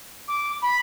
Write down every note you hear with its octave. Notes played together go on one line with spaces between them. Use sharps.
D6
B5